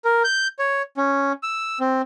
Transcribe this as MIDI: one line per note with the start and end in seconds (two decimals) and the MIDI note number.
0.05 0.23 70
0.24 0.48 91
0.59 0.82 73
0.97 1.32 61
1.43 1.79 88
1.80 2.02 60